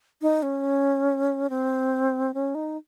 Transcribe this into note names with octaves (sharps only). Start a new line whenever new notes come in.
D#4
C#4
C4
C#4
D#4